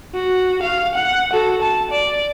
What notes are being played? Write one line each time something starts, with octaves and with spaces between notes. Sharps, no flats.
F#4
F5
F#5
F#4 A4
A5
D5